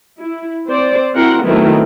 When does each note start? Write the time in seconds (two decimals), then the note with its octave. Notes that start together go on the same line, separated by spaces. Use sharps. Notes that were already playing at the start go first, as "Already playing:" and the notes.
0.21 E4
0.67 C4 C5 D5
1.14 C4 E4 F#4 A#4 F#5 C6
1.44 D#3 F#3 A3 B3 C4 E4